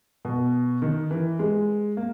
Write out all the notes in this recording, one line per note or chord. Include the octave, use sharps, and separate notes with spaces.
B2
D#3
E3
G#3
A#3